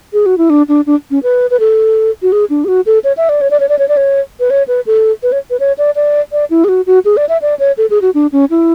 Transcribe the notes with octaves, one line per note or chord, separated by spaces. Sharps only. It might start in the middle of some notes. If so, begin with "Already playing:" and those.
G#4
F#4
E4
D4
D4
D4
C#4
B4
B4
A4
F#4
G#4
D4
G#4
F#4
A4
C#5
E5
D5
C#5
D5
C#5
D5
C#5
D5
C#5
B4
C#5
B4
A4
B4
C#5
B4
C#5
D5
D5
D5
E4
G#4
F#4
F#4
G#4
D5
E5
D5
C#5
A4
G#4
F#4
D4
C#4
E4